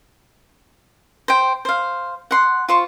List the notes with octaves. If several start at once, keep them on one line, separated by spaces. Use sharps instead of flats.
C5 G5
C5 F5
F#5 C6
F4 C5 C#6